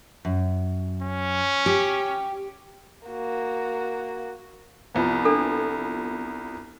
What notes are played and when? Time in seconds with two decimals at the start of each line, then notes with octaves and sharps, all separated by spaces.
0.25 F#2
1.02 C#4
1.66 G4
3.08 A#3 F#4
4.94 C2 F3 B3
5.25 D4 A4